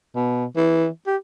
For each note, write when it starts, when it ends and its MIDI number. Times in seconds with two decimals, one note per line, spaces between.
0.16 0.45 47
0.56 0.87 52
1.07 1.16 67